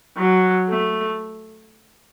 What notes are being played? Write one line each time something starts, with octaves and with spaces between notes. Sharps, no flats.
F#3
A3